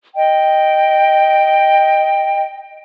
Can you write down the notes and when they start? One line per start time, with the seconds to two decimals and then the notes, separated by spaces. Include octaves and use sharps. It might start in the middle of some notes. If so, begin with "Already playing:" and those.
0.17 D#5 G5